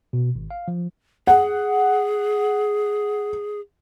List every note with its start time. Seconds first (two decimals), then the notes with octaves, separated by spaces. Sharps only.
0.13 B2
0.35 G#1
0.51 F5
0.68 F3
1.27 G#4 F#5